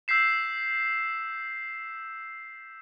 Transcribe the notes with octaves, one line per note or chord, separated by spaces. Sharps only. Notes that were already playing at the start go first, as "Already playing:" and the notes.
E6 G6 B6 C7 E7